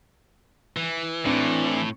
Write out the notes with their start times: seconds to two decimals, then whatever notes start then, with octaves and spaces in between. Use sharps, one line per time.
0.77 E3
1.26 A2 C4 D4